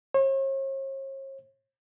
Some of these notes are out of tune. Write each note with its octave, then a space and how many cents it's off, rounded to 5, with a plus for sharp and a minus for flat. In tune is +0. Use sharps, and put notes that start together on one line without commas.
C#5 -45